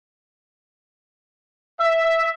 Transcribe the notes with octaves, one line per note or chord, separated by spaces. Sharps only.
E5